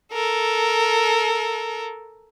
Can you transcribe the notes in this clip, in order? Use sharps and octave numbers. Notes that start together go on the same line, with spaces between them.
A4 A#4